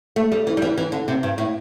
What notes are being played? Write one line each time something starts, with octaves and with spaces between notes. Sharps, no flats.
A3
G3
E3
G3
E3
E3
D3
C3
G2
A2